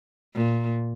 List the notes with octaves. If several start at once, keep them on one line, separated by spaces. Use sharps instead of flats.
A#2